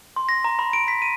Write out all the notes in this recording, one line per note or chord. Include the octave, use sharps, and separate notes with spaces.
C6
A#6
A#5
B5
D7
B6
D#7